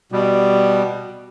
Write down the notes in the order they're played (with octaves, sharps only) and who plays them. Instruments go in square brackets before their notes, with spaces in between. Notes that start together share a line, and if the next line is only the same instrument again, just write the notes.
[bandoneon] B2 G3